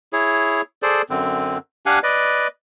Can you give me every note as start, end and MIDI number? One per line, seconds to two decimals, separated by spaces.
0.13 0.61 64
0.13 0.61 68
0.13 0.61 73
0.82 1.02 68
0.82 1.02 69
0.82 1.02 72
0.82 1.02 74
1.10 1.58 42
1.10 1.58 50
1.10 1.58 60
1.86 1.99 62
1.86 1.99 67
1.86 1.99 77
1.86 1.99 78
1.86 1.99 80
2.03 2.47 71
2.03 2.47 74
2.03 2.47 75